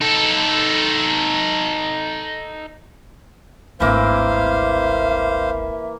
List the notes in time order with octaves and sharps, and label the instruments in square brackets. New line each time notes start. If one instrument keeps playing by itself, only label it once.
[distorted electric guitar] D#4 A4
[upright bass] D1 G#1 [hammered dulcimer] E3 A#3 [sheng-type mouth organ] C5 F5 [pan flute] E5